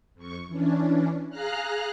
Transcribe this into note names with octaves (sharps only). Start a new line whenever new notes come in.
F2 C#6
E3 C#4 D4
G#4 F5 A#5 F6 F#6